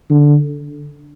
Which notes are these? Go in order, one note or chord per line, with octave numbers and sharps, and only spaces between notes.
D3